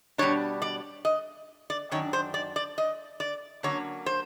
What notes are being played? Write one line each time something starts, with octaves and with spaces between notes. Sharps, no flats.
B2 G3 A#3 D4 C#5
D5
D#5
D5
F#2 D#3 D4 C#5
C5
D5
D5
D#5
D5
D3 F#3 A#3 C#4 C#5
C5